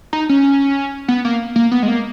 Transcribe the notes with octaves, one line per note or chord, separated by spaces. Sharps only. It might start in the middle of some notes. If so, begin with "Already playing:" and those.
D#4
C#4
B3
A#3
A#3
B3
G#3
A#3